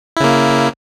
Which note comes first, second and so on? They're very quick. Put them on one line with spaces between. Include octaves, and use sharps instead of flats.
E4 C#3 A#3